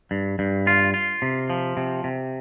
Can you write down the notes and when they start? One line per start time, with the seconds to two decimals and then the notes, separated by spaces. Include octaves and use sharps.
0.11 G2
0.39 G2
0.67 F4
0.94 F4
1.22 C3
1.50 F3
1.77 C3
2.04 C3